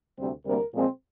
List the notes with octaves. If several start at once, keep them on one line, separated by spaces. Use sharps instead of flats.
D2 C3 G3 C4
D2 C3 G3 A#3 A#4
A#2 F3 G#3 C4